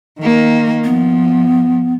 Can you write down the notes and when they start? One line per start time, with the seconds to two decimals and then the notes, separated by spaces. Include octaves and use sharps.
0.20 D#3 A#3
0.84 F3 B3